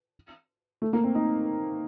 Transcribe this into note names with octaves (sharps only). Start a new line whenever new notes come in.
A3
A#3
C4
D#4